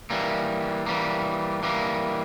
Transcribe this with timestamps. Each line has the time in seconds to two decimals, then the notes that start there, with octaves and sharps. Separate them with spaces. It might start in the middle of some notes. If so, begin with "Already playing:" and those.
0.10 E3 G3 A#3
0.86 E3 G3 A#3
1.63 E3 G3 A#3